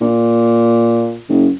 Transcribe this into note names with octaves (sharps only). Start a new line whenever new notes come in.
A#2
F#1